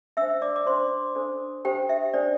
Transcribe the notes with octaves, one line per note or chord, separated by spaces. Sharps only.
D4 C5 E5 E6
D5 D6
D6
D4 C5 C6
D4 A4 C5
D4 G4 A4 C5 G5
E5
D4 A4 C5 D5